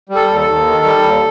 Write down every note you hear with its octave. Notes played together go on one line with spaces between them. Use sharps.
G3
A4
D#2
A4
D#2
D#3
G3
D#2